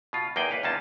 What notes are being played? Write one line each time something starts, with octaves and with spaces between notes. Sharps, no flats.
B2 F4
E2 A#3 D#4 G#4 D#5 G5
C#2 B4 F5
E2 A#2 C#4 D#4 F4 A5